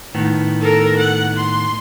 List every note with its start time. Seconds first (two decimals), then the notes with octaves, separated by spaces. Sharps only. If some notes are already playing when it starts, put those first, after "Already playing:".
0.15 A2 D#3 B3
0.61 A4 A#4
0.98 F#5
1.37 C6